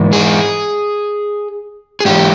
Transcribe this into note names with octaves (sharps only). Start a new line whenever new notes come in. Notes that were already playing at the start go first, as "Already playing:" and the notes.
Already playing: G#2 E3
G#4
G#4
G#2 E3 G4